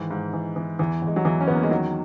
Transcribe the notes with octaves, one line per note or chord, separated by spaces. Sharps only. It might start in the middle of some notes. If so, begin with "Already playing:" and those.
Already playing: G#2 D#3 E3
G#2
E3
E3
E2 E3
E2
G#3
F#3
E2 E3
C#4
E2 B3
A#3
G#3
D#3 F#3